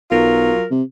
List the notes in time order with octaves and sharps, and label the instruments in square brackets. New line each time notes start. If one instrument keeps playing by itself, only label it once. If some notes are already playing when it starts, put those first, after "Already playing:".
[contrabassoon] B1 [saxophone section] F#3 F4 A#4
[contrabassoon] C3